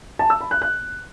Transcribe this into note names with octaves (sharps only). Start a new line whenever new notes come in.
A5
E6
B5
F#6
F#6